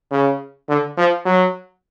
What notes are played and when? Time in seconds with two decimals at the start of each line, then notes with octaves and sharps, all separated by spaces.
0.11 C#3
0.69 D3
0.97 F3
1.25 F#3